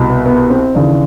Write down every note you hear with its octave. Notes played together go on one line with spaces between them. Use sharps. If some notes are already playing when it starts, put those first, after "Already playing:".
Already playing: C2 B2
B3
B3
C4
D#2 C#3 E3 D4